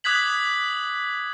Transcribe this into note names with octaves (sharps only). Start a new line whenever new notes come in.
D6 D#6 F#6 G#6 B6 F#7